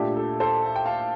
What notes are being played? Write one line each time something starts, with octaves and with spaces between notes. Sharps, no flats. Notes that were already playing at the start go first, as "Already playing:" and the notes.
Already playing: A#2 A3 D4 G4
A4
A4 C5
A5
G5
F5 A5